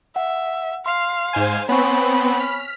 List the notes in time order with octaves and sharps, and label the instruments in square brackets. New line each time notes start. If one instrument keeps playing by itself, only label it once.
[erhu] E5 [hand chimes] F#5
[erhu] F5 [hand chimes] C6 C7
[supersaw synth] G#2 C5 G#5
[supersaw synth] B3 C4 [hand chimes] C#5 G#5 C#6 [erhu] B5
[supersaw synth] F6 B6